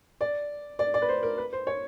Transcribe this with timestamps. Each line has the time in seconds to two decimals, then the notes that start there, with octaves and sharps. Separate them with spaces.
0.21 D5
0.79 D5
0.94 D5
1.02 B4
1.09 C5
1.23 A#4
1.38 B4
1.53 C5
1.67 C#5